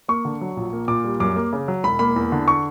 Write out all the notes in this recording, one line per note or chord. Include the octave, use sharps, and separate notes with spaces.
A#3 C#6
D3
F#3
A#1
A#3
A#2 D6
G3
F#2 D6
A#3
C#3
F#3
E1 B5
A#3 B5
E2
D3
C#6